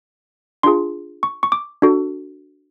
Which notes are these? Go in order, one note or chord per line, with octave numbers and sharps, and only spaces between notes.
D4 F4 G#4 C6
C#6
C#6
D6
D4 F#4 A4